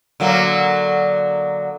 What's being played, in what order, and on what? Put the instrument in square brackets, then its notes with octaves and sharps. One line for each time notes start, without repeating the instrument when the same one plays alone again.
[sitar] D3 F#3 A#3